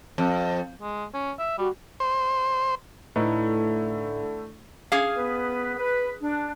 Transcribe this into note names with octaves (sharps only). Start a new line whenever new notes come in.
F2
G#3
C#4
E5
G3 F#4
C5
A2 D3 A3 D#4 E4 B4
C#4 G#4 F5
B3 B4
B4
D4